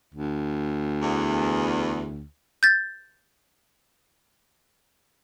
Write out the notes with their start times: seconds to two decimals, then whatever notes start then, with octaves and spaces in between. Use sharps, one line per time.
0.14 D2
1.00 E2
2.63 G6 A6